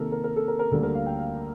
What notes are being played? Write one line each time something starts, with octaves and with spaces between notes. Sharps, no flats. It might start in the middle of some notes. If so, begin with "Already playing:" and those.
Already playing: C3 D#3 A#3 A4 A#4
A#4
A#4
A4
A#4
A#4
D2 D3 G3 A#3 A4
A#4
F5
G5
F5